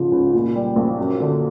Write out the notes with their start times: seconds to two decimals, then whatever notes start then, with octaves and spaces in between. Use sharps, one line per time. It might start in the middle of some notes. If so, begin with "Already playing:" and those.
Already playing: G#2 C#3 F3
0.12 C#2
0.34 A#2
0.55 G3
0.76 A#1
0.98 F#2
1.20 D3